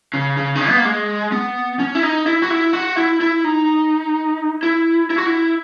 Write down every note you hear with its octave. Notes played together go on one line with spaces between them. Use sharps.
C#3
C#3
D#3
C#3
B3
A#3
G#3
B3
C#4
E4
D#4
E4
F#4
E4
F#4
E4
E4
D#4
E4
E4
F#4
E4